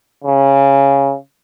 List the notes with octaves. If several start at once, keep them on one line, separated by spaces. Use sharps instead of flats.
C#3